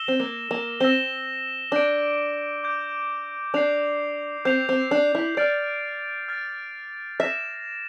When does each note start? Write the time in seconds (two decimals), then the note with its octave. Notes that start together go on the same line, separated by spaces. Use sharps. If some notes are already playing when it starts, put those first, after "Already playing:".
Already playing: E6 A#6 E7 G7
0.08 C4
0.20 A#3
0.51 A#3
0.80 C4 E6 A#6 E7 G7
1.71 D4 D6 G6 D7
2.64 D6 G6 D7
3.54 D4 G6 C7 F7
4.45 C4 G6 C7 F7
4.69 C4
4.91 D4
5.15 E4
5.37 D5 F6 A6 D7
6.28 F6 A6 D7
7.19 E5 F6 A#6 E7